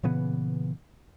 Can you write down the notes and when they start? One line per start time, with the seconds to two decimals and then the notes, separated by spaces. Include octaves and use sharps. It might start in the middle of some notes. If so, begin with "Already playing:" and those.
0.03 A#2 C#3 E3 B3